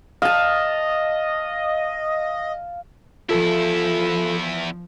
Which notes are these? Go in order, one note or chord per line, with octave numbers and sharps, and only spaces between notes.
D#5 F5 A5
E2 F3 E4 F4 A4